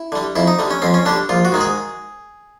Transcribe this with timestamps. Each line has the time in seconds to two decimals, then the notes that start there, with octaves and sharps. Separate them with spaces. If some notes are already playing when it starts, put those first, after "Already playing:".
Already playing: E4
0.12 D3 G3
0.36 F2 E4
0.47 D#4
0.59 D3 G3
0.71 C#4
0.82 F2 C4
0.94 C#4
1.06 D3 G3 D4
1.29 A#1 F4
1.45 F#4
1.52 G#2 D#3 G#3
1.61 G#4